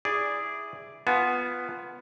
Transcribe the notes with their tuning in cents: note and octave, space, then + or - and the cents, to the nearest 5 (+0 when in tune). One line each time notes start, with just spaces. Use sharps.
E4 +0 G#4 -10 D5 +0
B3 +0 F4 +0 G#5 +45